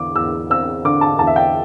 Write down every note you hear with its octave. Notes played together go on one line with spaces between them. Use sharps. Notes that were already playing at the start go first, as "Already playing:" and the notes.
Already playing: E2 D3 D6
E2 E6
C4 E6
D3 D6
A5
E2 A5
E5
G5